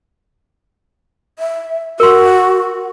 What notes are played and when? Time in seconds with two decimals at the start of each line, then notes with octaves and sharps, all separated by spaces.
1.39 E5
2.00 F#4 A#4 C6